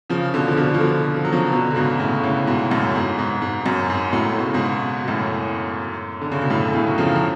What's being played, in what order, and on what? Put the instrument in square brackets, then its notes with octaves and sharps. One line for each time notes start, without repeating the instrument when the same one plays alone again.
[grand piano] C#3 F3
B2 D3
F3
B2 D3
F3
B2 D3
F3
F#3
C#3 F3
B2 D3
C#3
G#2 B2
A2 C#3
A2 C#3
G#2 B2
F#2 A2
G#2
G#2 B2
G#2
F#2
G#2
F#2 A2
B2
C#3
G#2 B2
B2
F#2 A2
D3
C#3
B2
F#2 A2
A2 C#3
F#3
C#3 F3
F3